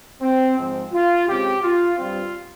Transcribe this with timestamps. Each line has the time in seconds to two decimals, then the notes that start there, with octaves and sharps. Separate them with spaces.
0.22 C4
0.58 G#2 F3 C4
0.93 F4
1.28 C#3 G#3 C4 G4
1.63 F4
1.97 G2 G3 C4 F4